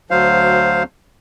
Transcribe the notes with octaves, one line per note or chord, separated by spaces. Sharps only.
D2 F#3 C5 F5